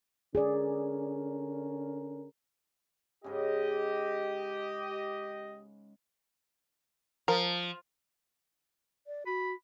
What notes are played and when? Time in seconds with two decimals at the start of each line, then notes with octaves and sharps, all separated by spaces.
0.35 D3 C#4 G#4 A#4 D5
3.24 G#2 C#3 G4 D#5
7.28 F3 A#4
9.07 D5
9.26 F#4 B5